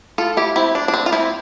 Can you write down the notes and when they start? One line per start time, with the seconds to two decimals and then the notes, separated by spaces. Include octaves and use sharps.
0.18 F4 A4
0.37 E4 G4
0.56 C4 E4
0.75 D4
0.88 D4
0.94 C4
1.06 F4
1.12 C4 E4